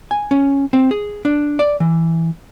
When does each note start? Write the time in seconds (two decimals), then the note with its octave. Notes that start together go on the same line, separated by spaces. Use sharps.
0.11 G#5
0.31 C#4
0.73 C4
0.91 G#4
1.25 D4
1.59 D5
1.80 E3